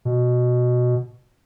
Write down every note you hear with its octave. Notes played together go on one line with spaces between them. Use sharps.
B2